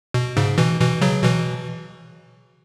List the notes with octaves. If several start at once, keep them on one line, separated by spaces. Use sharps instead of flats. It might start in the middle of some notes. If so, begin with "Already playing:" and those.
B2
G#2 C#3
B2 E3
B2 E3
C#3 F#3
B2 E3